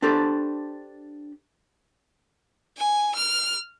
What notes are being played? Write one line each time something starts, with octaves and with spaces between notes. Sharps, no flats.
D4 G4 A4 C5
G#5
F6